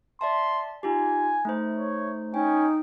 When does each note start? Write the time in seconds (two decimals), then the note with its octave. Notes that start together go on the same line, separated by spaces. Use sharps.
0.21 D5 E5 A5 C6
0.83 D#4 F4 G4 G#5
1.45 A3 D#4 C5
1.77 C#5
2.34 C#4 D#4 G5